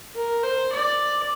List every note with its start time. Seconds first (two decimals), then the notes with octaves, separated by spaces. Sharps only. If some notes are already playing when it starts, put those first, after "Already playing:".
0.15 A#4
0.43 C5
0.72 D5